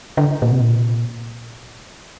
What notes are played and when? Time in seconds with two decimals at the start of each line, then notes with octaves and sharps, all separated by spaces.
0.17 D3
0.42 A#2
0.51 C3
0.60 A#2